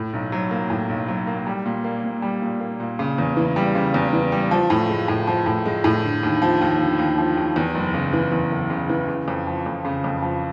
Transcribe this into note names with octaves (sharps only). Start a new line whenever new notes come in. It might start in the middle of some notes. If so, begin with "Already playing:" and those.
Already playing: A2
B1
F#3
A#3
A2
B1
F#3
A#3
G3
A#2
A#3
A#2
G3
A#2
A#3
A#2
C#3
E2
E3
G3
C#3
E2
E3
G3
F3
A2
G#3
A2
F3
A2
G#3
A2
D3
D#2
F3
D#2
D3
D#2
F3
D#2
E2
F#1
C#3
E3
E2
F#1
C#3
E3
C#3
F2
F3
F2
C#3
F2
F3